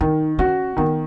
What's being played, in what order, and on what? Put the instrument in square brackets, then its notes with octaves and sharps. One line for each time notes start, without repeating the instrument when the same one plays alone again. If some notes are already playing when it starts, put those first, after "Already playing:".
[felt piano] D#3 [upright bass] D#4
[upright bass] C#4 [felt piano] F#4
[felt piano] D#3 [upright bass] B3